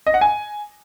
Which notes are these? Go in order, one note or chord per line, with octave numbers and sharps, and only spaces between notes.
D#5
F#5
G#5